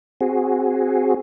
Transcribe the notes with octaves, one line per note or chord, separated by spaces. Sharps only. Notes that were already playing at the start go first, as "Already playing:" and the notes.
C4 F#4 G#4